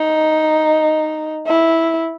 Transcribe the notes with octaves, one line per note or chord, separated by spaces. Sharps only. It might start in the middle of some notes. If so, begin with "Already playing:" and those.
Already playing: D#4
E4